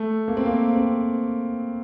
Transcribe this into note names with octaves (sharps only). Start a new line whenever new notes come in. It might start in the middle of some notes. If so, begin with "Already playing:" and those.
Already playing: A3
A#3
C4
A#3
C4